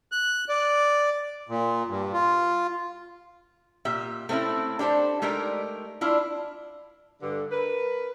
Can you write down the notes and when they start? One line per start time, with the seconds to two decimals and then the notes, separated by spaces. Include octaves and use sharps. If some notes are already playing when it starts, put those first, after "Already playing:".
0.12 F#6
0.49 D5
1.49 A#2
1.88 G2
2.13 F4
3.85 A#2 G4 E5
4.29 A3 C4 C#4 D#4 E4
4.79 D4 G4 A4 C5
5.22 G#3 A3 D#4 G4 A#4 D5
6.01 D4 E4 F4
7.21 G2 D3
7.51 A#4 B4